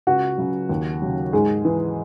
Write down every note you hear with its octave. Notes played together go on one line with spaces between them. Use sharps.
C#2 F#4 F#5
C#3 F#3
D#2
C#3 F#3
G#2 G#3 G#4
E3